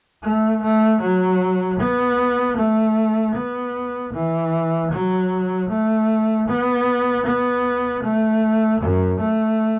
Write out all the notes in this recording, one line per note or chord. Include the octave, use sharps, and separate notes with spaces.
A3
A3
F#3
B3
A3
B3
E3
F#3
A3
B3
B3
A3
F#2
A3